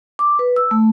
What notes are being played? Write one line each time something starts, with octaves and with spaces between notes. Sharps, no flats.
D6
B4
E6
A3